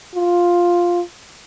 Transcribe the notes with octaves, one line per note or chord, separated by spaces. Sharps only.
F4